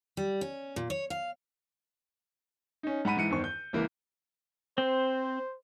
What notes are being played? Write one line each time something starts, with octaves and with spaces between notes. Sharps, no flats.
G3
C#4
A#2
C#5
F5
C#4 D#4
G#2 F#5 B5 D#7
G#2 E3 C#7 D#7
E2 G2 D#3 C5 C#6
G6
C#2 E3 A#3
C4 C5